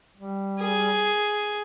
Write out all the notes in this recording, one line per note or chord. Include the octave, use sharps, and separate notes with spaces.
G3
G#4